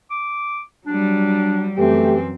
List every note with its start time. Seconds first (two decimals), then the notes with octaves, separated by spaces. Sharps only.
0.10 D6
0.87 F#3 G3 D4
1.78 F#2 E3 A3 C4 G4